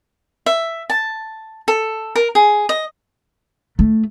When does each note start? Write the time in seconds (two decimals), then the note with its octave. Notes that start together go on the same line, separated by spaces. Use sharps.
0.46 E5
0.90 A5
1.68 A4
2.16 A#4
2.35 G#4
2.69 D#5
3.79 A3